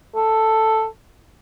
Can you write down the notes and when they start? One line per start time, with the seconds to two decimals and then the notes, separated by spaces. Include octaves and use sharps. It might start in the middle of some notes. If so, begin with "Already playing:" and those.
0.15 A4